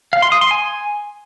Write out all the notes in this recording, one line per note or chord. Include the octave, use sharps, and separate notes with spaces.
F5
C6
D#6
C6
G#5